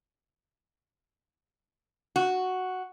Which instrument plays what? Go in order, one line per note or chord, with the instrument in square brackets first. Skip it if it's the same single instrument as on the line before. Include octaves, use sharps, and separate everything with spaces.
[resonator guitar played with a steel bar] F#4